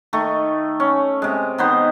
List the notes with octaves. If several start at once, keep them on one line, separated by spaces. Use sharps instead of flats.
D#3 A3
C#4
C3 G#3
D#3 B3 C5